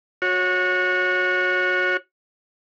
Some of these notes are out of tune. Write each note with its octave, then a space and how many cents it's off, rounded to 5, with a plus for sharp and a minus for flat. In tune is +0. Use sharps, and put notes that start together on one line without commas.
F#4 -25 C#5 -10